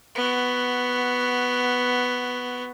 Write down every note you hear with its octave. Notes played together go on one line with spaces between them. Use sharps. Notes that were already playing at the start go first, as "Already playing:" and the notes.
B3 F#4